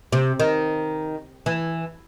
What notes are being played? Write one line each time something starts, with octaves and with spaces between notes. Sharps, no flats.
C3
D#3
E3